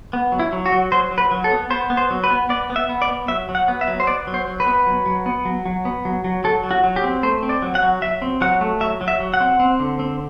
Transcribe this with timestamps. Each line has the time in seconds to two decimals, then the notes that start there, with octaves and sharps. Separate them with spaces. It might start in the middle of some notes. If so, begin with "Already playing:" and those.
0.13 B3
0.32 F#3
0.40 E4
0.53 F#3
0.66 F#4
0.72 F#3
0.92 F#3 C5
1.11 F#3
1.18 B4
1.31 F#3
1.44 A4
1.51 B3
1.70 B3 C5
1.90 B3
1.97 C5
2.10 F#3
2.24 B4
2.30 B3
2.49 B3 D5
2.70 B3
2.76 E5
2.89 B3
3.02 D5
3.09 B3
3.28 F#3 E5
3.49 F#3
3.55 F#5
3.68 B3
3.81 E5
3.88 F#3
4.00 C5
4.07 B3 D5
4.27 F#3
4.34 C5
4.47 F#3
4.60 B4
4.66 B3
4.86 F#3
5.06 F#3
5.26 B3
5.45 F#3
5.66 F#3
5.85 B3
6.05 F#3
6.24 F#3
6.44 F#3 A4
6.64 F#3
6.71 F#4
6.84 F#3
6.96 G4
7.04 C4
7.23 A3 C5
7.43 C4
7.49 D5
7.62 F#3
7.75 F#5
7.82 F#3
8.02 F#3 E5
8.22 C4
8.41 F#3 F#5
8.61 A3
8.80 F#3 E5
9.01 F#3
9.08 E5
9.20 F#3
9.34 F#5
9.40 C4
9.60 C4
9.80 D3
10.00 C4